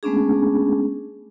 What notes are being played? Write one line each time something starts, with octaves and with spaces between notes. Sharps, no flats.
G#3 A3 B3 C#4 D4 G#4